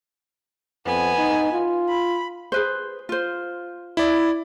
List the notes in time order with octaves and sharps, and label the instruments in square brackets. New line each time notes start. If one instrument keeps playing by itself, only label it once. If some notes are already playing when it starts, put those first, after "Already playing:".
[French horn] F2 [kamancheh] B3 G#5
[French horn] D#4
F4
[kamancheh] B5
[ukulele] G#4 B4 C5
F4 C5
[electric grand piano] E4 D5